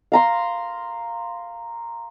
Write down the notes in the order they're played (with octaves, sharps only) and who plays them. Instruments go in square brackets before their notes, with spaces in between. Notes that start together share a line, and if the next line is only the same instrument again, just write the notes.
[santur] F5 A#5 C6